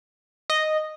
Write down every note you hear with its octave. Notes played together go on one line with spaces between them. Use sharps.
D#5